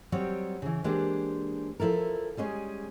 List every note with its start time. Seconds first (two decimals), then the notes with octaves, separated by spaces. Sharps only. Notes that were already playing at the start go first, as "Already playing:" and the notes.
0.12 F#3 G3 C4 C#5
0.62 C#3 E3
0.84 E3 G#3 A#3 D4 G4 C5
1.80 F3 E4 A4 A#4
2.37 G3 G#3 C#4 G#4